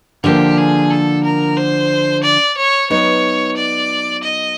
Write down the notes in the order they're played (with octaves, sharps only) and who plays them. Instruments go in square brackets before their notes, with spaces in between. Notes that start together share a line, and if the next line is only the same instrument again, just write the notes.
[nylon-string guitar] D3 F3 A#3 [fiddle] G4
[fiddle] G#4
A4
A#4
C5
D5
C#5
[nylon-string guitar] F#3 B3 D#4 [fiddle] C#5
[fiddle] D5
D#5